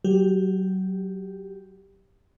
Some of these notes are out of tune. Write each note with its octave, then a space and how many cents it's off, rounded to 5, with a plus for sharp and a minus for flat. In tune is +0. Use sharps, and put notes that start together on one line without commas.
F#3 +25 G4 +5